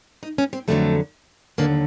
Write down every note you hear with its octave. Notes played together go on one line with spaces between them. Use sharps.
D#4
C#4
C4
F2 D3 F#3 A3
D#2 D3 F#3 A#3